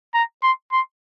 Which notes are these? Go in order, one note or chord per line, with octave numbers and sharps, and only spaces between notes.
A#5
C6
C6